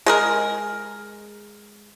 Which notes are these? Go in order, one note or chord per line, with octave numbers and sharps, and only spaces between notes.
G#3 G#4 A#4